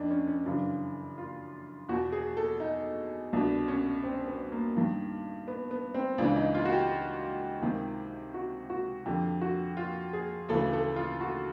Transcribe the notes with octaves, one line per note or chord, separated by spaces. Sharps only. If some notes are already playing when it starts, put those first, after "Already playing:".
Already playing: F2 D4 D#4
C#4
C#4
F#2 C#3 E3 D4
F4
E2 B2 F#4
G#4
A4
D#4
C2 B2 D4
C#4
C4
B3
A#3
G2 D#3
B3
B3
C4
C#2 C#3 E3 D4
D#4
F4
F#4
G4
C#2 C3 D#3
F#4
F#4
F2 D3 G4
F#4
F4
G#4
D2 C#3 E3 A4
A4
F4
F#4